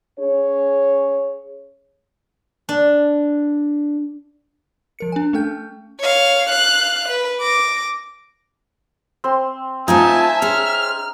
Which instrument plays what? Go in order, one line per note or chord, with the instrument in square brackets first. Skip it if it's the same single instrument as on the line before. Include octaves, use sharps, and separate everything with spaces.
[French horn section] C#4 G#4 C#5
[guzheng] D4
[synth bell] F3 A#4 C#7
D4 G#5
A3 C#4 A4 G5 G6
[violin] C#5 F5
F5 F#6
B4
D6 A#6
[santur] C4 C6
[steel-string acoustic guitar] A3 C4 F4 [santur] D#4 [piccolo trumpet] E5 [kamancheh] G#5 A5
[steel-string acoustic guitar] C#4 G#4 C5 [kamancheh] F6